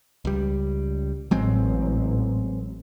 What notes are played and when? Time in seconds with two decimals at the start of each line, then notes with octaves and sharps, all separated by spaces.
0.25 C#2 G3
1.31 A1 F#3 G#3 C4